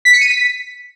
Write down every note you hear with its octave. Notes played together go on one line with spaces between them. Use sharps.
B6
C#7
D#7
B6